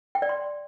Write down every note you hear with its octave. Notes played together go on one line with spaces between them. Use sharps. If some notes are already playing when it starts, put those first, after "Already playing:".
G5
D5
C6